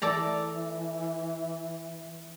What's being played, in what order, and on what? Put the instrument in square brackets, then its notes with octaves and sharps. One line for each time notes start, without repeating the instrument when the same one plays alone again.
[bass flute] E3 [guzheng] A4 D5 A#5